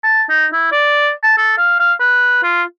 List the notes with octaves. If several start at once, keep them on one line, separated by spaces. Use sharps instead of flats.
A5
D#4
E4
D5
A5
A4
F5
F5
B4
F4